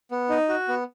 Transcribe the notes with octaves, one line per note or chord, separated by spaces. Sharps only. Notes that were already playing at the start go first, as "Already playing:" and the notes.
B3
D#4
F#4
B3